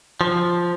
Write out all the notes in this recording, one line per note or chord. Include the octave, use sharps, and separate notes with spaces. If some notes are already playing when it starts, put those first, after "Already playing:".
F3